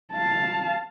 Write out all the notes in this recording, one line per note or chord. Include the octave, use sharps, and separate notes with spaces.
F5 A5